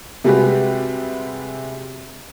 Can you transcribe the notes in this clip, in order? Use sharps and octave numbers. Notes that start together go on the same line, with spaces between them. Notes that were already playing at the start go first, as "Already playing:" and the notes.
C3 G3 G#3 F#4 G4 B4